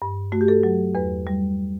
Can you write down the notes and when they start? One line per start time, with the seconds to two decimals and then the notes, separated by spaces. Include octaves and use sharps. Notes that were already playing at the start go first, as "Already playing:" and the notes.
0.02 G2
0.32 A3 F#4
0.41 G4
0.48 A4
0.63 F#3
0.95 E2 B4
1.27 G3